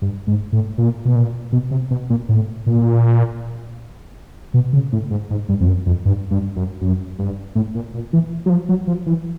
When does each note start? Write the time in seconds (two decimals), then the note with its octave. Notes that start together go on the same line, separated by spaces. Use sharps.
0.02 G2
0.27 G#2
0.52 A2
0.78 A#2
1.05 B2
1.16 A#2
1.52 B2
1.71 C3
1.91 B2
2.10 A#2
2.29 A2
2.66 A#2
4.54 B2
4.73 C#3
4.92 A2
5.10 G#2
5.30 G#2
5.49 G2
5.60 F2
5.67 F#2
5.86 F2
6.05 G2
6.31 G2
6.56 F#2
6.81 F#2
7.19 G2
7.55 A2
7.75 A#2
7.94 A#2
8.13 E3
8.46 F#3
8.50 F3
8.69 F#3
8.87 F3
9.06 E3